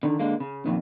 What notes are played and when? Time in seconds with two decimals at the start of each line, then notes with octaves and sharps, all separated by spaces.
0.03 D3 D#3
0.19 D3 G#3 A#3
0.40 C#3
0.66 F2 A#2 D#3